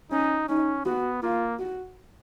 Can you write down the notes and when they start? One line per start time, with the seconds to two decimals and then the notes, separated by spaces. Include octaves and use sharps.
0.11 C#4 D#4
0.48 C#4 D#4
0.85 B3 F#4
1.22 A#3 F4
1.59 F#4